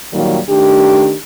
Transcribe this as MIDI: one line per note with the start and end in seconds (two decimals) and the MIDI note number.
0.13 0.38 46
0.13 0.38 51
0.13 0.38 54
0.13 0.38 55
0.13 0.38 58
0.49 1.14 51
0.49 1.14 57
0.49 1.14 62
0.49 1.14 67